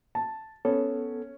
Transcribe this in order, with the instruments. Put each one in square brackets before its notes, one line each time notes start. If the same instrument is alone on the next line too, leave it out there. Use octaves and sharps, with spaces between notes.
[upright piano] A5
[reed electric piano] B3 A4 [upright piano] C#4